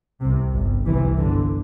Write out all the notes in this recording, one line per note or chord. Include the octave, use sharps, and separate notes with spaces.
C2 C3
G1 G2
C2 C3 E3
G1 G2 D3